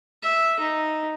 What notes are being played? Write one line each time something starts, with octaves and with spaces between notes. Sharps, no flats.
E5
D#4